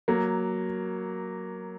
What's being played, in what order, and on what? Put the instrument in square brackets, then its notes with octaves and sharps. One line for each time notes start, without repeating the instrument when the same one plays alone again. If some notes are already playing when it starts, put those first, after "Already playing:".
[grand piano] F#3 A#3